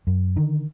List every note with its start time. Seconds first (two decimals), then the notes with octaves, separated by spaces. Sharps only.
0.07 F#2
0.36 D3 D#3